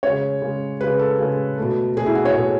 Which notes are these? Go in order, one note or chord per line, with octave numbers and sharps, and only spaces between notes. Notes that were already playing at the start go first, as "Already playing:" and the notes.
C#3 G#3 C#5
C#3 G#3
C#3 G#3 B4
A4
C#3 G#3
B2 A3
B2 A3 G#4
E4
F#4
C#5
B2 A3 G#4